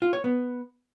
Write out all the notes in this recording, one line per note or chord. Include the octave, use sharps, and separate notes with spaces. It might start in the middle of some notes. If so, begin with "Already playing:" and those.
F4
C#5
B3